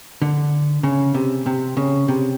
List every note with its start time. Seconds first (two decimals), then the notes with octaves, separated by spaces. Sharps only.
0.22 D3
0.83 C#3
1.14 C3
1.46 C3
1.77 C#3
2.08 C3